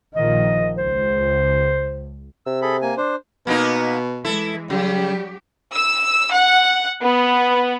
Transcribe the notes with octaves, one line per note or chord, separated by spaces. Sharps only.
A#1 D#3 F3 D#5
C#2 C5
C3 E6
G#4 A4 B5
A#3 G#5
D4 C5
B2 A#3 B3 D#4
E3 G#3 E4 A4
C#3 F#3 G3 G4
E6
F#5
B3